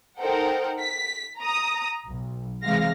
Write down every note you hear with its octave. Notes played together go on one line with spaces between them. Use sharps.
D#4 A4 A#4 C5 F#5 G5
B6
A#5 D#6
B1
C3 E3 G#3 F5 A#6